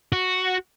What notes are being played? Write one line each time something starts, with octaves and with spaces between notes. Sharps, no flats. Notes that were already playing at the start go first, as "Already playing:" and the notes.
F#4